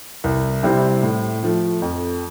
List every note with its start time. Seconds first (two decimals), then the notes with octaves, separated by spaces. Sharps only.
0.24 C2
0.63 C3 G3 C4 E4
1.03 A2
1.43 F3 A3
1.82 F2